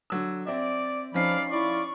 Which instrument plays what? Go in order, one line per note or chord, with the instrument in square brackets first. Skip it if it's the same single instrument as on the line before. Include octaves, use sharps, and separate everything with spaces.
[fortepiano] D3 F#3 E6
[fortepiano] C4 E5 [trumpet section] D5
[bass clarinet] F3 [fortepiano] C#4 D#4 [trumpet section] D5 F5 [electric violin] B5 C7
[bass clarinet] E4 [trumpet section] F4 D5 [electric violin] C#6